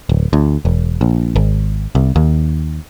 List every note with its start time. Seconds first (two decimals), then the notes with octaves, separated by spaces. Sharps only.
0.09 D1
0.33 D2
0.65 E1
1.01 A#1
1.36 G#1
1.95 C2
2.16 D#2